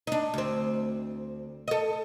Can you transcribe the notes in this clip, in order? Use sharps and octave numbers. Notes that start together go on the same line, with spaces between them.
D4 D#4
D2 C4
A4 D#5